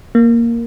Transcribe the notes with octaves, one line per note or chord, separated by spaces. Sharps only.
A#3